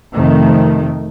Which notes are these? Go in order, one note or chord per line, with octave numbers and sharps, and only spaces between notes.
F2 C3 D#3 A3